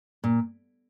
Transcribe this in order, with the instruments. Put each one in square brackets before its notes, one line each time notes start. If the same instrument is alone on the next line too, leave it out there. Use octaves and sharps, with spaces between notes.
[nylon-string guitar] A#2